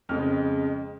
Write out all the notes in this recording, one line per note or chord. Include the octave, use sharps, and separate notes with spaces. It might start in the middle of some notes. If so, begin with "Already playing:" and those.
F2 C#3 G#3 F6